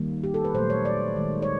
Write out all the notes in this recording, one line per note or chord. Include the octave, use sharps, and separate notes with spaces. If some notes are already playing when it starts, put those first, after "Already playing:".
Already playing: D#3 G3 A#3
G4
A4
B4
A#2 F#3 A3 C5
C#5
D5
D#3 G#3
C#5